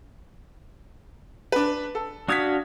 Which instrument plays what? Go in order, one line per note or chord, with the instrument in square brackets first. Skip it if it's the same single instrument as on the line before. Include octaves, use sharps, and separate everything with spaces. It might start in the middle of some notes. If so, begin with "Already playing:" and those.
[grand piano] D4 B4
A4
[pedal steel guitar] D4 F#4 F5 [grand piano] D#6 G#6 B6